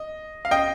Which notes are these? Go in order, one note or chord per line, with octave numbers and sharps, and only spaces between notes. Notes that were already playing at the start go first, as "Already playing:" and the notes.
Already playing: D#5
F5
D#5 G5